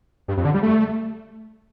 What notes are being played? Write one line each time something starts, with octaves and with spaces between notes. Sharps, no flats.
G2
F2
D3
G3
A3